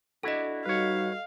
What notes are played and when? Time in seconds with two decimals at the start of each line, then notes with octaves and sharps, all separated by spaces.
0.23 D4 E4 F#4 A4 D#5
0.65 G3 D#4 F#4 B4 C#5 F5